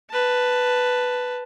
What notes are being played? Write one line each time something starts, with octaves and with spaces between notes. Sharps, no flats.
B4 A5